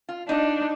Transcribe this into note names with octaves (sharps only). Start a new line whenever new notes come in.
F4
D4 D#4